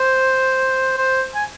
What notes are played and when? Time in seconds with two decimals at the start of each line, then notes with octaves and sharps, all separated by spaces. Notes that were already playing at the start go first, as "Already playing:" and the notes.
Already playing: C5
0.97 C5
1.35 G#5